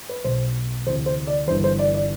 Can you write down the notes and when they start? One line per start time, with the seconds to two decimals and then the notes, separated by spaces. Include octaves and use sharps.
0.09 B4
0.24 B1 B2 C5
0.86 D2 C3 E3 C5
1.06 C5
1.27 D5
1.47 G1 G2 E3 C5
1.64 C5
1.79 D5
1.95 D5